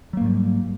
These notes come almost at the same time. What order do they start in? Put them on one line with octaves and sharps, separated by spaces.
F#3 A#3 G#2 G3